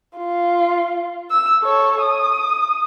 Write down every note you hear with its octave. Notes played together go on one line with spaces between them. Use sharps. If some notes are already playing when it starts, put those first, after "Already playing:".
F4
E6
A4 C#5
D#6